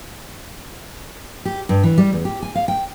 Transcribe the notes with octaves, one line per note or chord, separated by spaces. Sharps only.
G4
G2
E3
G3
E2
G4
G#5
F5
G5